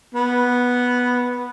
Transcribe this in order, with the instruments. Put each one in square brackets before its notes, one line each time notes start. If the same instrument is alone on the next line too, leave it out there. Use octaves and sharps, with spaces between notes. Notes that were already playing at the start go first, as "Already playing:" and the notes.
[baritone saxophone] B3